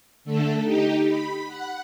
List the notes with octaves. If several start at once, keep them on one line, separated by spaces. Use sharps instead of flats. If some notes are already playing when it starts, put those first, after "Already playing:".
D3 A3 A4
D#4 G4
B5
F#5